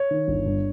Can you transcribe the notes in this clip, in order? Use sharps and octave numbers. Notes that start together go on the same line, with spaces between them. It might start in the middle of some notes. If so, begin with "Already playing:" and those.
Already playing: C#5
D#3
G1
G2